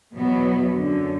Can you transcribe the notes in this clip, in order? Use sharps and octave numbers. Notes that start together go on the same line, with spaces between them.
E2 B2 F#3 B3
F#2 D3 F#3